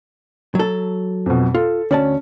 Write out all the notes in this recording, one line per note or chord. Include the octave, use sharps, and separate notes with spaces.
F#3 A4
F2 B2
F4 A4
D2 C#4 D5 A5